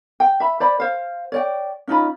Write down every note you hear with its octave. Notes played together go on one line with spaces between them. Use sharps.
G5
E5 B5
C5 D5 B5
C5 F5
C#5 D5 G5
C#4 D#4 F4 B5